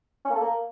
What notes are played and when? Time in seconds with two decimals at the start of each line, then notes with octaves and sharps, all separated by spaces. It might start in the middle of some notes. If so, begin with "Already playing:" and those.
0.25 C#4
0.30 A#3
0.35 A4
0.40 A#3